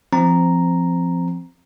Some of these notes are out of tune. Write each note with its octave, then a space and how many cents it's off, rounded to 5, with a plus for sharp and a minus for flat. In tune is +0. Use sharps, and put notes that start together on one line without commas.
F3 -20 C4 -5 A#5 +0